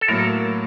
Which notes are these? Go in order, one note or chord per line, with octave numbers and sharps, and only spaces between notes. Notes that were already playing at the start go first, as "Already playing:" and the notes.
A4
A2 F#3 A#3 A#4